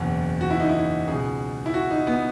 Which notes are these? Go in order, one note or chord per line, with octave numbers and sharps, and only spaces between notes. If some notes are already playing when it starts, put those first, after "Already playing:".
Already playing: F#1 E2 B2
F#4
E4
D#4
E4
C#2 B2 G#4
E4
F#4
D#4
B3